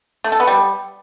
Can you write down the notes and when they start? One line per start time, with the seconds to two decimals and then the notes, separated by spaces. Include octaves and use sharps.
0.24 A3
0.32 A4
0.40 B3
0.48 G3